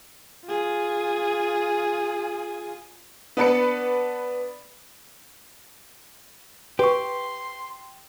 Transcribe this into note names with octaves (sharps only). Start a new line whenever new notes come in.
F4 G#4
B3 D4 B4 C#7
G4 B4 C6 C#6